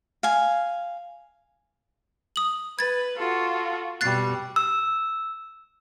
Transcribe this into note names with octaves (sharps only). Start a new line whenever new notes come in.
F5 G#5
D#6 F#7
B4 G#6 A6
F4 F#4 A4
B2 G3 F#6 A6 C7
E6